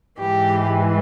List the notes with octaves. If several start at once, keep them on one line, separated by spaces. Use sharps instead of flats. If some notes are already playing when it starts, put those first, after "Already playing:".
G#2 E3 G#3 G4